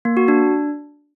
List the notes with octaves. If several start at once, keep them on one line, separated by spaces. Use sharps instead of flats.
A#3
F#4
D4